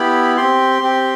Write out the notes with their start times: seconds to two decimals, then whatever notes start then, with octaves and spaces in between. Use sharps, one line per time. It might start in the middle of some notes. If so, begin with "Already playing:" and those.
Already playing: B3 E4 G4 B5
0.37 C4 G4 C6
0.82 C4 G4